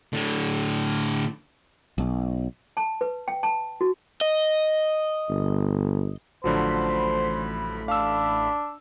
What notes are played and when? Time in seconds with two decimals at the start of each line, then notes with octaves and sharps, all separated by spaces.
0.13 A2 D3
1.98 B1
2.77 A5
3.01 B4
3.28 G5
3.43 A5
3.81 F#4
4.21 D#5
5.30 G1
6.44 A1 D3 F3 F#3 A3 C5 B5
7.88 D4 F5 E6